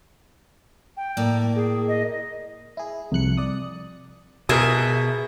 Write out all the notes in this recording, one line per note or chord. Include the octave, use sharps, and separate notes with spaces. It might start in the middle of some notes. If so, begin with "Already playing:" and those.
G5
A2 A#3 D5
G#4
D#5
E4 G#4
C2 F2 F#6 C#7
D5 D#6
B2 G#4 A#4 E5 D#6